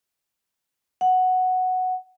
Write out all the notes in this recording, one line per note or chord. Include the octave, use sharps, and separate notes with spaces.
F#5